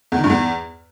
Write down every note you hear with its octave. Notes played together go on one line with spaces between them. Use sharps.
E2
D#3
G2
E2